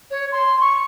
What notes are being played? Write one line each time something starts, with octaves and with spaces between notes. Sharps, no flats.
C#5
C6
C#6